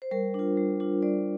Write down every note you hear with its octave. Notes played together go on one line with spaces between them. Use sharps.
C5
G3 A#4
D4 F4
G3
D4 F4
G3 D5